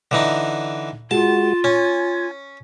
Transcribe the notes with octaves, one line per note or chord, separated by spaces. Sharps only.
D3 E3 D#4
G#3 F4 F#4 A5
C#4 G#5